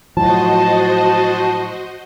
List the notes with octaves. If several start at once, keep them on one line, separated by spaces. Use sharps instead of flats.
A2 F3 F#3 F#4 C5 D#5 A5